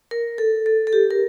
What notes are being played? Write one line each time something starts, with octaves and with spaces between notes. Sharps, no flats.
A#4
A4
A4
A4
G4
A#4